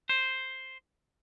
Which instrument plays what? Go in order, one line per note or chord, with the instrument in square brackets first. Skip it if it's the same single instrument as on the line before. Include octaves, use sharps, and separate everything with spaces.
[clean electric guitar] C5